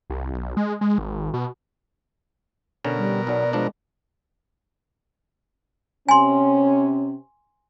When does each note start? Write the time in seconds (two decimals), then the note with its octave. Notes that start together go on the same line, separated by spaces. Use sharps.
0.10 C2
0.34 B1
0.57 G#3
0.81 G#3
0.98 G#1
1.34 B2
2.85 B2 D3 C#4 A#4
2.97 G3
3.27 B1 F#3 D5
3.53 F3 G#3 D4
6.09 C3 C#4 G#5 C6